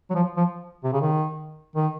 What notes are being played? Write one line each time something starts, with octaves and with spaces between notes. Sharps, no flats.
F#3
F3
F3
C3
C#3
D#3
D#3